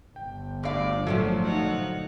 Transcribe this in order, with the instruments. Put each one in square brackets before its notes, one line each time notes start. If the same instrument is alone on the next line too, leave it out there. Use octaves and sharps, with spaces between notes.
[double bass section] G1 [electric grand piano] G5
[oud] D2 F5 [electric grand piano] G2 [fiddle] D5
[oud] A#2 F3 A3 [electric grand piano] F#3 C5 F5
[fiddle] D#4 F#5